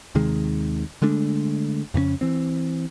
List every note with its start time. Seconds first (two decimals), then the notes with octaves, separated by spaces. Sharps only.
0.15 D#2 C3 D#3 G#3
1.02 D3 G#3 A3 D4
1.94 F2 C#3 B3 C#4
2.21 E3 C4